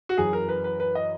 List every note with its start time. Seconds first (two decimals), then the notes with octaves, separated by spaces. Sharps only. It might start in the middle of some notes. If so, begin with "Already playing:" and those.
0.09 F#4
0.17 F#2 E3 G#4
0.33 A#4
0.49 B4
0.64 B4
0.80 B4
0.95 D#5